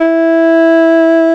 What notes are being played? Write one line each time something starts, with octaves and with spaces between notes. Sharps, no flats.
E4